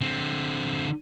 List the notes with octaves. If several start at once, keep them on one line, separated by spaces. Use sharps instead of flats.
D3 C4